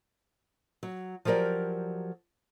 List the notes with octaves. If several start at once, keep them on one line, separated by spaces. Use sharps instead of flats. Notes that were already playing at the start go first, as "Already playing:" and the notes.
F#3
F3 F#3 G4 A#4 D5